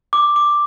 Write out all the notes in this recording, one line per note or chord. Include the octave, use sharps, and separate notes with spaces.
D6
D6